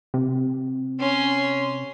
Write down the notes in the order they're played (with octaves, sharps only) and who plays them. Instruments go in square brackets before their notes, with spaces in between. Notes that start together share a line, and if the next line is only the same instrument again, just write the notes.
[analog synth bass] C3
[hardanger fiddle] C#4 C6